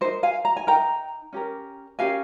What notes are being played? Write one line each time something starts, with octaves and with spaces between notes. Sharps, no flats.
D#4 A#4 C5
F5 G#5
A#5
G#5
D#4 A#4 G5 A#5
C#4 G4 A#4
C#4 G4 A#4 F5 G#5